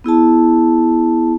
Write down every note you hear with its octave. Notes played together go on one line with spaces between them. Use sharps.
B3 E4 G#4 A5